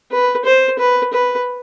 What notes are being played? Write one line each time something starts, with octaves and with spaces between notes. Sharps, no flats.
B4
C5
B4
B4